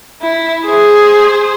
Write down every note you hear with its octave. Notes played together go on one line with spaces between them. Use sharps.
E4
G#4 C5